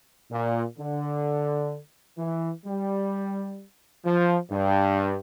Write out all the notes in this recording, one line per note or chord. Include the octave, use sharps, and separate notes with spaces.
A#2
D3
E3
G3
F3
G2